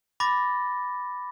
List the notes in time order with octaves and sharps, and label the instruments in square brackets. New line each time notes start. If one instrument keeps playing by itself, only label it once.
[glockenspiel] B5 D6 A6 A#6